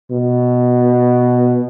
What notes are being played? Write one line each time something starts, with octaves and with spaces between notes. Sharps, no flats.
B2